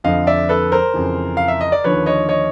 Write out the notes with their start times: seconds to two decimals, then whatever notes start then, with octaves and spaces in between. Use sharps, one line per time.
0.04 F2 D3 F3 D#5 F5
0.27 D5 E5
0.49 A4 B4
0.72 A#4 C5
0.94 F2 C#3 E3
1.37 F5
1.48 E5
1.61 D#5
1.72 D5
1.84 D#2 D3 F3 B4 C#5
2.06 C#5 D#5
2.29 C#5 D#5